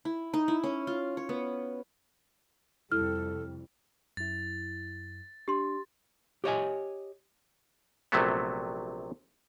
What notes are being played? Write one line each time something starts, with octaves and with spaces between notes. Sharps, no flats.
E4
D#4
E4
C#4
F4
C#5
B3
F2 C3 G3 E4 A4 F6
F#2 E4 A6
D4 G4 C6
G4 C#5 D#5 G#5
A#1 C3 F#3 A3 B3